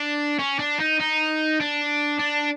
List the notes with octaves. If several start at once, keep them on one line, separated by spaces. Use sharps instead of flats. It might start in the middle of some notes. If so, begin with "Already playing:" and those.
Already playing: D4
C#4
D4
D#4
D#4
D4
D4